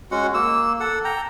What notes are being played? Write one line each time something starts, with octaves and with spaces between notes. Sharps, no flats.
G#3 C#4 F#4 F#5
A#3 E6
A4 F#5
G5 A#5